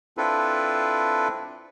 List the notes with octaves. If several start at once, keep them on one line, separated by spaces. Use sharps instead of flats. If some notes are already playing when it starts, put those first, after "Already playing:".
C4 D4 E4 F4 A4 B4